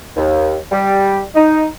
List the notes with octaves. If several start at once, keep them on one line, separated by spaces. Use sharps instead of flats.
D#2
G3
D#4